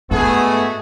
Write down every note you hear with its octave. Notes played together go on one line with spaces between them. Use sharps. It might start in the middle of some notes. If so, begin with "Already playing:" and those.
G#2 G#3 A3 B3 F#4 G#4